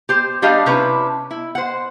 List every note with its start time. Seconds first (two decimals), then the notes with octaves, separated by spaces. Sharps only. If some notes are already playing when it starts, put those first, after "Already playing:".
0.09 G4 C5
0.42 G3 D4 G4 D#5 F5
0.66 C3 C#4 D4 E4 B4
1.31 E4
1.55 C5 F#5